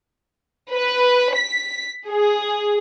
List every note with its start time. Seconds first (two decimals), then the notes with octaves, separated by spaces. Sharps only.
0.70 B4
1.35 B6
2.09 G#4